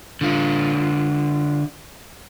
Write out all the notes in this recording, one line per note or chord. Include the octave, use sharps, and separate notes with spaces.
D3 F4